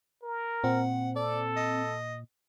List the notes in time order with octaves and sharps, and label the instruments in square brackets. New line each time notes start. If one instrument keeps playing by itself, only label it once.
[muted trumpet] A#4
[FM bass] A#2 [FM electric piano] C4 [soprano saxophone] F#5
[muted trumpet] A4 [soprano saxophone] D5
[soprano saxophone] D#5